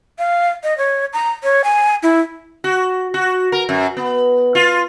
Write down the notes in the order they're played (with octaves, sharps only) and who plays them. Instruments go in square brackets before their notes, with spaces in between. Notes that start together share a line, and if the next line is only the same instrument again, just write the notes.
[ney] F5
D#5
C#5
A#5
C#5
G#5
E4
[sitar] F#4
F#4
A#4
F#2
B3
F4